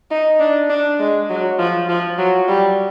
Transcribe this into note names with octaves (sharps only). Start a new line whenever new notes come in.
D#4
D4
D4
G#3
F#3
F3
F3
F#3
G3